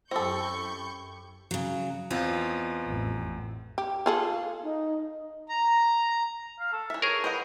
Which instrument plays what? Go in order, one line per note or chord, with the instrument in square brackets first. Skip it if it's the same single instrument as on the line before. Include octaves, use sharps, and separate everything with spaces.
[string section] F#2 C#6 G6 [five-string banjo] C4 A4 [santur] E4 G4 [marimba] C5
[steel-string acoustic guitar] C#3 F#3
[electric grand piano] E2 C4 [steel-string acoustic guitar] B3 F4 D#5
[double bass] A1 F2
[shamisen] G4
F4 G#4 A4
[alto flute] F5
D#4
[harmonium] A#5
[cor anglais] F5
A4
[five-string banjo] E3 E5
[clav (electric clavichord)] G#4 A#4 [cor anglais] C#5
[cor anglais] B4 [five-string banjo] C5 D#5 F#5